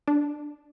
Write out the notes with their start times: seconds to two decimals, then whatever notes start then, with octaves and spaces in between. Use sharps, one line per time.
0.08 D4